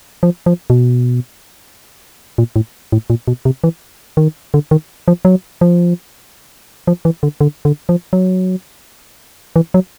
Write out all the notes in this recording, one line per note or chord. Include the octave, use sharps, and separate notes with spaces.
F3
F3
B2
A#2
A2
A2
A#2
B2
C3
E3
D#3
D3
D#3
F3
F#3
F3
F3
E3
D3
D3
D3
F3
F#3
E3
F#3